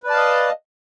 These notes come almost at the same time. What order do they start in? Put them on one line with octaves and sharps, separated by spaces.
B4 D5 A5 F5 D#5